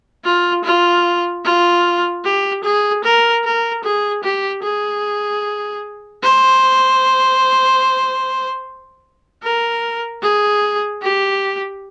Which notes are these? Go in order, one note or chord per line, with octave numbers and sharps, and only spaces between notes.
F4
F4
F4
G4
G#4
A#4
A#4
G#4
G4
G#4
C5
A#4
G#4
G4